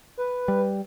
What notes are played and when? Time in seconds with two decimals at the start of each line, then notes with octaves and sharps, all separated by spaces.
0.17 B4
0.48 G3